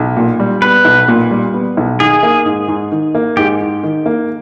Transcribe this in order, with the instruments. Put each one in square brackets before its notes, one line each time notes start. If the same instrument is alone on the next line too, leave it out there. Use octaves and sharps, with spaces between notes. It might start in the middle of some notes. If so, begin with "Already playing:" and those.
Already playing: [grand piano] B1
A#2
G3
[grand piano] B3 [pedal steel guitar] B4
[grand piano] B1
A#2
G3
B3
B1
[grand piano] D#3 [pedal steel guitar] G#4
[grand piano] A#3
G#2
G#2
D#3
A#3
[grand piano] G#2 [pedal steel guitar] G4
[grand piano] G#2
D#3
A#3